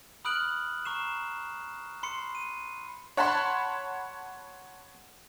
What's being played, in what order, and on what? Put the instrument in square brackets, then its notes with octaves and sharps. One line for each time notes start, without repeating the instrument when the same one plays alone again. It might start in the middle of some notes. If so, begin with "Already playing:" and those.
[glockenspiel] B5 D#6 F6 F#6 D7 F#7
A#5 C#6 C7 E7
B5 C6 C7 C#7
D#7
[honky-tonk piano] C#5 F#5 A5 B5 C6